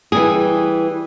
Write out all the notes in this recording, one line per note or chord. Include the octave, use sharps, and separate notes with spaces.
E3 G3 G#4